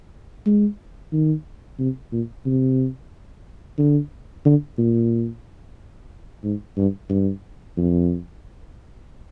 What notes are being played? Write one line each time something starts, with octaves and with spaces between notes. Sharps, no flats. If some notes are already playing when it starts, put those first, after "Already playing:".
G#3
D#3
C3
A#2
C3
D3
D3
A#2
G#2
G2
G2
F2